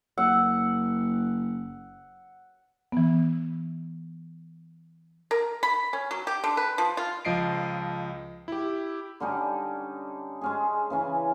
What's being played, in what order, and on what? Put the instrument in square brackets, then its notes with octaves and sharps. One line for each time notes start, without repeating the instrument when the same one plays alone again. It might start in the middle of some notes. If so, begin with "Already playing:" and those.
[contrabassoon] F#1 [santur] F#5 [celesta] E6
[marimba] E3 B3
[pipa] A#4
B5
C#4
F#3
G4
D3
B4
F3
F4
[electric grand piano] C#2 F3 D#5 C7 D7
E4 G4
[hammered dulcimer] D3 G3 C#4 D#4
G#3 C#4 G#4
C#3 E3 C#4